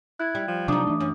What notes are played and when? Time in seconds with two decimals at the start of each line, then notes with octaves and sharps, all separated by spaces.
0.20 E4 F#6 G#6
0.35 G3
0.48 F3
0.68 C3 F#3 D4 D#4 D6 D#6
0.87 E3 A3
1.00 F#2 C#4